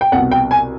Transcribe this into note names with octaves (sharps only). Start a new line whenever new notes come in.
G5
C2 B2 F#5
G5
G#5